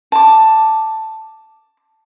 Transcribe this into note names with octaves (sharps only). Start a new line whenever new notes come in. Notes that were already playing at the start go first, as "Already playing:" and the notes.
A5 D6